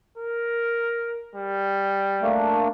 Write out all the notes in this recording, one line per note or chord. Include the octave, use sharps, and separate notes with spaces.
A#4
G3
A3 A#3 D4